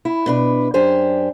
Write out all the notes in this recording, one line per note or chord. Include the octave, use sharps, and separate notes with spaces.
E4
B2 D4 B4
F#2 D4 G4 C5 G#5